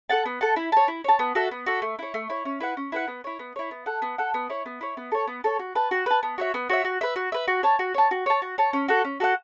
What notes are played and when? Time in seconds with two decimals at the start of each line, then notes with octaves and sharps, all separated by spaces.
0.10 A4 F#5 A5
0.26 B3
0.41 A4 F#5 A5
0.56 E4
0.72 C#5 A5
0.88 E4
1.04 C#5 A5
1.19 B3
1.35 F#4 A4 E5
1.51 B3
1.66 F#4 A4 E5
1.82 A3
1.99 E4 C#5
2.14 A3
2.30 E4 C#5
2.45 C#4
2.60 E4 B4 F#5
2.77 C#4
2.92 E4 B4 F#5
3.07 B3
3.24 E4 C#5
3.39 B3
3.56 E4 C#5
3.71 B3
3.86 A4 F#5
4.02 B3
4.18 A4 F#5
4.34 B3
4.50 E4 C#5
4.66 B3
4.81 E4 C#5
4.97 B3
5.12 A4 C#5
5.27 B3
5.44 A4 C#5
5.59 F#4
5.75 B4 A5
5.91 F#4
6.06 B4 A5
6.23 B3
6.38 F#4 C#5 E5
6.54 B3
6.69 F#4 C#5 E5
6.85 F#4
7.01 B4 E5
7.16 F#4
7.32 B4 E5
7.48 F#4
7.63 C#5 A5
7.79 F#4
7.94 C#5 A5
8.11 F#4
8.26 C#5 A5
8.42 F#4
8.58 C#5 A5
8.73 C#4
8.88 F#4 A4 F#5
9.04 C#4
9.20 F#4 A4 F#5